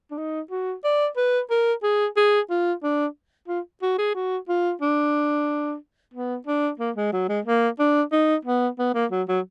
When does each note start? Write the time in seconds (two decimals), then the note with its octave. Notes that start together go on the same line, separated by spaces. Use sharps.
0.11 D4
0.18 D#4
0.51 F#4
0.84 D5
1.17 B4
1.50 A#4
1.83 G#4
2.17 G#4
2.50 F4
2.83 D4
3.48 F4
3.83 F#4
3.98 G#4
4.15 F#4
4.49 F4
4.82 D4
6.14 B3
6.47 D4
6.80 A#3
6.96 G#3
7.12 F#3
7.29 G#3
7.45 A#3
7.79 D4
8.12 D#4
8.45 B3
8.79 B3
8.94 A#3
9.11 F#3
9.28 F#3